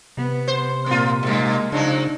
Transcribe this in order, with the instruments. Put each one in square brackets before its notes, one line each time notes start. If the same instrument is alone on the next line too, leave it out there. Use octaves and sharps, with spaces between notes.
[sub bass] C3 [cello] B3
[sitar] C5
[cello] A#2 C4 [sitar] A#3 F4
[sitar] G2 A#2 [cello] G#3 A#3
[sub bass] C#3 [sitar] F3 F#3 A#3 [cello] D4 D#4